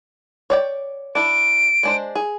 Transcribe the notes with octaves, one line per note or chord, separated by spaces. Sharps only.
C#5 D5 G5
D4 E4 D7
G#3 D4 C5
G#4